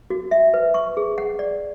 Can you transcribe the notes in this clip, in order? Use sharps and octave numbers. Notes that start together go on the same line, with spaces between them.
F#4
E5
B4
C#6
G#4
F#5
D5